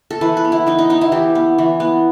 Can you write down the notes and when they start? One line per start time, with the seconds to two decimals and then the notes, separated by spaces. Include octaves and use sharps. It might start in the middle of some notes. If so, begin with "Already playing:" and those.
0.10 A4
0.21 E3 B4
0.37 B4
0.45 B3
0.52 E4
0.67 E3 D#4
0.79 D#4
0.90 B3 D#4
1.01 E4
1.12 E3 G4
1.35 B3
1.58 E3
1.80 B3